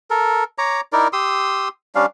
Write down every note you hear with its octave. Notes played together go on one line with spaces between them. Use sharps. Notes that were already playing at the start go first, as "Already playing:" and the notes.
A4 A#4
C#5 A#5 D6
D#4 E4 A#4 D5
G4 C6 D#6 E6
G3 C#4 D4 F5